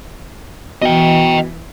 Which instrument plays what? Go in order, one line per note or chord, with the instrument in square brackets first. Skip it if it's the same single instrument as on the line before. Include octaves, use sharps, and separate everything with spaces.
[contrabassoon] B2 [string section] E3 [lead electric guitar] D#5 G5